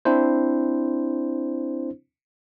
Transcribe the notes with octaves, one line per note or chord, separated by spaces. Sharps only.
C4 D4 E4 C5